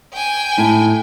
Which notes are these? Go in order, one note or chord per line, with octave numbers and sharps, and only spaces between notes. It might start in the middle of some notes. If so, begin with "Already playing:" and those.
G5 G#5
A2 E4